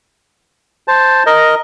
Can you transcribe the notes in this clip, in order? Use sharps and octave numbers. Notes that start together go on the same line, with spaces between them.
C5 A5
A#4 D#5